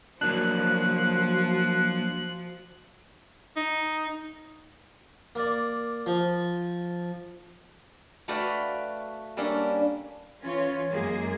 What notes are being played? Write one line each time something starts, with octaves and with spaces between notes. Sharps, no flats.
F3 F#3 A#3 D4 F#4 F#6
D#4
A#3 D5
F3
A3 F#4 B4 D5 F5 G5
G3 A#3 C#4 D4 A4
E3 C#4 F4 C#5
F#2 G#3 A#3 G#4